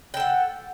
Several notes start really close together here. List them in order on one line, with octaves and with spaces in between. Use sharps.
G5 A4 F#5